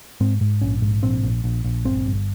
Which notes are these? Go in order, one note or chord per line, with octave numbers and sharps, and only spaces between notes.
G#2 C4
G#2
A#1 C#4
G#2
A#1 C4
A#1
A#1
A#1
G1 C4
G1